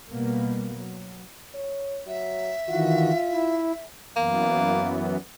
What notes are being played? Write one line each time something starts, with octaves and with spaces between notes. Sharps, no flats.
B2 G3 A#3 B3
F#3
C#5
F#3 E5
D#3 E3 F4 F#4
E4
F#2 E3 A#3 B3